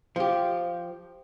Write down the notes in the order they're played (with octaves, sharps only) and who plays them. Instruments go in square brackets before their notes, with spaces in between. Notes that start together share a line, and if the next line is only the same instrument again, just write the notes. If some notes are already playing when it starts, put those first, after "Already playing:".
[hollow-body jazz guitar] F3 G4